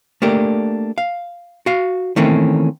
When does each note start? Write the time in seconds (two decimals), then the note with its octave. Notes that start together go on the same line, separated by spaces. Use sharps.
0.22 A3 A#3 D4 G4
0.98 F5
1.66 F#4 F5
2.16 D#3 E3 A3 A#3 C4 C#4